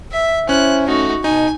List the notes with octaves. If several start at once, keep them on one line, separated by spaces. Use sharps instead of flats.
E5
C#4 E4 C5 G#5 F#6
A3 D#4 F#4
B2 D#4 G#5